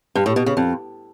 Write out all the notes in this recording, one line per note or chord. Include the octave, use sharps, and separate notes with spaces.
G2
A2
B2
C#3
F2